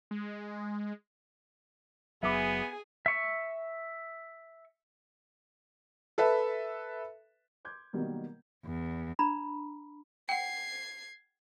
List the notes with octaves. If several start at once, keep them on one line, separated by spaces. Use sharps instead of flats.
G#3
F#1 F#3 B3 G#4 E5 G#5 B5 D6
E5 C#6
A4 B4 E5
C6 D6 G6 G#6
B2 D#3 F#3 G3 A#3 B3
E2
D4 A#5 B5
F#5 G5 G#6 C7